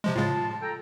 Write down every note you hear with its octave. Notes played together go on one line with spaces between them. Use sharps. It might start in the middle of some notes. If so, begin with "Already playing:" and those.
C3 F3 G#3
A2 C#3 G#3 F4 A5
A4 G5 A#5